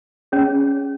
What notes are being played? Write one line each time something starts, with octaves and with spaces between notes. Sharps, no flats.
C#4 G#4 C#5